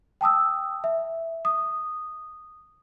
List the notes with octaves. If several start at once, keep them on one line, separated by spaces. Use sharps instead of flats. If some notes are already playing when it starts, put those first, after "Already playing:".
G5 A5 D#6 E6
E5
D#6